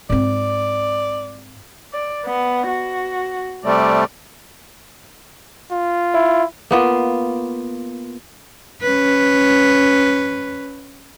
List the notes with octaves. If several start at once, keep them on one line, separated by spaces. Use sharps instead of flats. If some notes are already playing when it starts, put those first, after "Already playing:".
G#2 C4 D5
D5
B3
F#4
C3 G3 A3 D5
F4
E4
A#3 B3 F4
C#4 B4